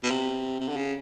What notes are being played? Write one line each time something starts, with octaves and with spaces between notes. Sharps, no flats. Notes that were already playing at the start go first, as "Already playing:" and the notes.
B2
C3
C3
D3
C#3